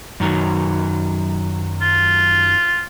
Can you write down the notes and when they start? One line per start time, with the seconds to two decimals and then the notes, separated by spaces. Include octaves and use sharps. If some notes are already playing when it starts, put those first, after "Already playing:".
0.20 F#2 D#3 F#3
1.81 F4